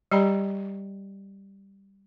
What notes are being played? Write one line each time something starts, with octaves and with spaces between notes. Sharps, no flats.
G3 G4 D5 G5 A#5 B5